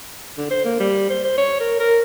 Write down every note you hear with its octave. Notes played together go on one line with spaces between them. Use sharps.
D3
C5
A#3
G3
C5
C5
C#5
A#4
A#4